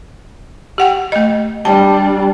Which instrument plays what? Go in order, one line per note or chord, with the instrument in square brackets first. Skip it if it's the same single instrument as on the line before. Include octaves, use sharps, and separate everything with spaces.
[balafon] G4 F#5 G5
A3 D#5
[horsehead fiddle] G3 D4 [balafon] A5